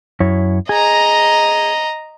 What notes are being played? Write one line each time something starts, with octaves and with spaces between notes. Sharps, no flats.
F#2 E4 C#5
G#4 D#5 A#5